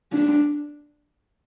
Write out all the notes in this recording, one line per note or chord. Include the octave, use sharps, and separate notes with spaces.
D4